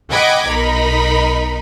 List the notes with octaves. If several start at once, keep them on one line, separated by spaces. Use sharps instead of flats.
D#5 F#5 G5 B5 D6 G#6
B1 D#4 A#4 B5